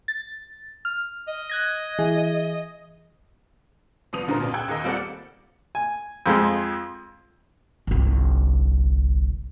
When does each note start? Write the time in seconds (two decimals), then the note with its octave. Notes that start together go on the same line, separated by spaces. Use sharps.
0.08 A6
0.85 F6
1.28 D#5
1.50 F#6 G#6 A#6
1.99 E3 G#4
4.13 C2 F3 B3 D#6 D#7 F7
4.27 F1 G2 A#2 D3 A#4 C5
4.40 C#2 G#2 B2
4.54 G5 E6 F#6 G#6
4.68 D#2 G#4 A#4 D#5
4.84 G3 A#3 C4 A4 D5 F#5
5.75 G#5
6.26 F2 F3 G#3
7.87 G1 C2